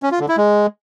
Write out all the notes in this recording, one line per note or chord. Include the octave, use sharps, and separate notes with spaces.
C#4
F4
D3
E4
G#3